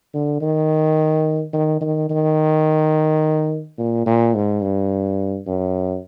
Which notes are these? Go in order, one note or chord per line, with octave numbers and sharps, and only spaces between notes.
D3
D#3
D#3
D#3
D#3
A#2
A#2
G#2
G2
F#2